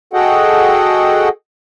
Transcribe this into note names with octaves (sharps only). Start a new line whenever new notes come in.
F#4 G#4 A4 D#5 F#5 G5